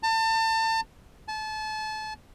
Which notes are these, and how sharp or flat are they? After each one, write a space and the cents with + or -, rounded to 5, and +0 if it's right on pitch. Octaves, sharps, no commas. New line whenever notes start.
A5 +35
A5 -30